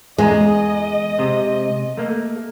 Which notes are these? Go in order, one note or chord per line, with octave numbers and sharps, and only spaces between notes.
E2 G#3 G#4 D#5 A#5
C3
A3 A#3